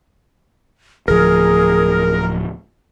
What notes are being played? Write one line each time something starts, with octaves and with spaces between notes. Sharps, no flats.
D1 D2 F3 G#4 A#4